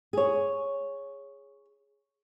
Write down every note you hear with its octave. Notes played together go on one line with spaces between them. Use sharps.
G#4 C#5